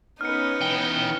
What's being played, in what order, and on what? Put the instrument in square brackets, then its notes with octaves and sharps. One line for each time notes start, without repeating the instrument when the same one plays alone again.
[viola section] B3 C#4 B4 [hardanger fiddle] D#4 [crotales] F6 C#7
[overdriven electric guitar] E3 G5 [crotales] G7